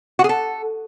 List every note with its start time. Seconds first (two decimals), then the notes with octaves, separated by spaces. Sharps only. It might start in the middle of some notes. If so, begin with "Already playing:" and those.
0.19 F#4
0.24 G#4
0.29 A4